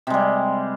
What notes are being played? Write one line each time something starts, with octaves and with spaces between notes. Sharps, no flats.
C3 G3 G#3